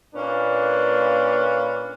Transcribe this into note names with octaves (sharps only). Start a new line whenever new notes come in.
A#2 A#3 C#4 D4 B4